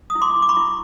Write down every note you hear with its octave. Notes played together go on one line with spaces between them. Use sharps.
D#6
E4
C6 D6
E4
D6
B5 C#6
E4